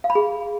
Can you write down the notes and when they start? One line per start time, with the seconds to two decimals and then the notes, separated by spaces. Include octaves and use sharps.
0.04 F5
0.10 B5
0.15 G#4